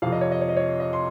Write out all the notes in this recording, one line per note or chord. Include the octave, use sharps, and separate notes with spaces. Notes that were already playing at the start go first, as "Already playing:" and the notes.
F2 C3 F3 F5
D#5
C#5
D#5
C#5
D#5
C#5
D#5
C6